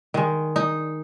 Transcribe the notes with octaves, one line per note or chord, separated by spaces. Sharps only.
D#3 G#3
D#4